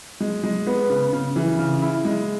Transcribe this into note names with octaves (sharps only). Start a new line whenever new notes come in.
G#3
G#3
B3
C#3
C#3
E3
C#3
E4
G#3